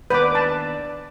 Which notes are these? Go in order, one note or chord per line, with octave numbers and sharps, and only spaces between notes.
D#2 B3 D4 B4 D6
A5